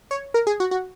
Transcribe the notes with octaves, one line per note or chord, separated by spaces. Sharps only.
C#5
A#4
G#4
F#4
F#4